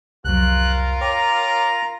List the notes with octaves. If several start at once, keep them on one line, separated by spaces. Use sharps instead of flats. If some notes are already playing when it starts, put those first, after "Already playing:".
C2 F2 F#3 F4 A#4 F#6
C#5 G5 A#5 D6